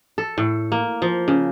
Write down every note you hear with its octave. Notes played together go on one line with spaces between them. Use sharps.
A4
A2
A#3
F3
C#3